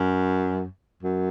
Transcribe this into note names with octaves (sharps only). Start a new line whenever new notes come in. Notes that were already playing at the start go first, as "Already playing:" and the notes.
Already playing: F#2
F#2